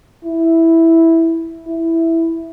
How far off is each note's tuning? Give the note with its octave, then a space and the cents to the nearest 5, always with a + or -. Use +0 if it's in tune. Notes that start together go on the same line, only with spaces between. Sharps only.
E4 -5
E4 +0